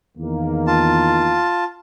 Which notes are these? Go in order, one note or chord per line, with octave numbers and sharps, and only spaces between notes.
E2 D#3 A#3
F4 A5